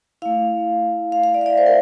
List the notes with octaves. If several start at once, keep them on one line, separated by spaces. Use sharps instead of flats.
A3 E4 F5
F5
F5
D5
E5
D5
C5
A#4